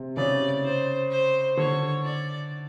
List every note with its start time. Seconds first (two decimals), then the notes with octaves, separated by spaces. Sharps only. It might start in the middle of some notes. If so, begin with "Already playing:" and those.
Already playing: C3
0.17 C#3 D5
0.64 C5
1.11 C5
1.57 D3 C#5
2.04 D5